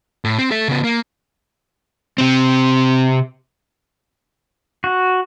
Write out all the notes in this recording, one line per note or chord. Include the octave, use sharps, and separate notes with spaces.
A2
C4
A4 E5
C#3 B3
A#3
C3 C4
F#4